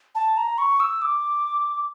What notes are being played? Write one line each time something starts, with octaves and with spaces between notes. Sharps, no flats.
A5
A#5
C#6
E6
D6